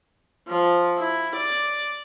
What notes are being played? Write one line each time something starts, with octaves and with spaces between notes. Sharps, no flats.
F3
E4
D5